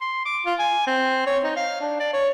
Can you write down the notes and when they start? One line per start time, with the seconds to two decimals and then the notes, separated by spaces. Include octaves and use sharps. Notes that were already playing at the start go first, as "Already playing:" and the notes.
0.01 C6
0.25 D6
0.46 F4
0.59 G#5
0.87 C4
1.27 C#5
1.44 D#4
1.56 F5
1.80 D4
2.00 D5
2.13 C#5